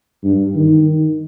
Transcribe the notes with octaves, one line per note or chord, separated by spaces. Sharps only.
G2
D#3